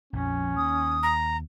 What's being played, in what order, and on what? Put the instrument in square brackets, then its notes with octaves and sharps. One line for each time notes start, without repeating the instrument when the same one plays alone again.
[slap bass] A#1 F2 F3 [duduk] C#4
[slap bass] D#2 [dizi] D#6
[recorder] A#5